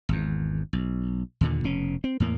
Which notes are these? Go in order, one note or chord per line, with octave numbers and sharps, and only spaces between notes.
G#1 E2
B1
D#2 A#2 D3
F1 B2 C#4
C4
E2 A2 A#3